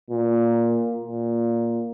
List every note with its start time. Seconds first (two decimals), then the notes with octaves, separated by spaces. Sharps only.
0.10 A#2
1.05 A#2